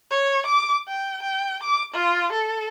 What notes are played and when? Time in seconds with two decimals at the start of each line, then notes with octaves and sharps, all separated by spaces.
0.11 C#5
0.46 D6
0.88 G5
1.23 G5
1.63 D6
1.94 F4
2.33 A4